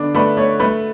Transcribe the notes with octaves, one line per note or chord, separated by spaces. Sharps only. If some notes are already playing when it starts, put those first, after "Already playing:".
Already playing: D3 B3 D4
A3 B4 D5
A3 C#5
A3 B4